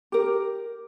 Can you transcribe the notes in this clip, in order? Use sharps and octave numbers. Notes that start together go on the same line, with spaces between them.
G4 A#4